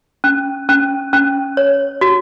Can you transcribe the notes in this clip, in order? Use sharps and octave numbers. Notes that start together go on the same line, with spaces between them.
C#4
C#4
C#4
C#5
F#4